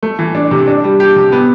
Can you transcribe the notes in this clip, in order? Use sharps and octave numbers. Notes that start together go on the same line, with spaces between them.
A3
E3
D4
C3
D4
G3
G4
C3
B3